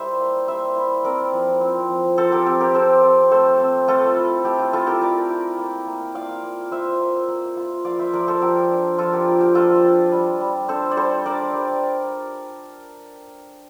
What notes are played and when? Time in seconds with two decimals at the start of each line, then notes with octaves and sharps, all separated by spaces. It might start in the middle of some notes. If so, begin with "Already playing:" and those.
Already playing: G3 E4 A#4 C5 E5
0.19 A#3
0.48 G3 C5 E5
0.76 E4
1.04 C4 A#4 D5
1.33 F3
1.61 C4
1.89 F3
2.18 F3 A4 C5
2.32 G4 A#4
2.46 C4 G4
2.60 G4 A#4
2.75 C4 A4 C5
3.03 C4
3.31 A3 A4 C5
3.60 C4
3.88 A3 F4 A4
4.16 E4
4.45 A3 G4
4.59 F4
4.73 E4 F4 A4
4.87 G4 A#4
5.01 A3 A#4 D5
5.30 E4
5.58 A#3
5.87 A#3
6.15 F4 D5 F5
6.43 A#3
6.71 F4 C5 E5
7.00 A#3
7.28 A#3
7.57 F4
7.84 F3 D5 F5
7.99 C5 E5
8.13 F3 A#4 D5
8.28 A4 C5
8.41 F3 G4 A#4
8.70 D4
8.98 F3 F4 A4
9.12 G4 A#4
9.27 A#3
9.41 G4
9.55 F3 F4 A4
9.83 D4
10.12 G3
10.41 G3
10.69 D4 A4 C5
10.91 D5
10.97 G3 A4 C5
11.25 D4 A#4 D5
11.54 G3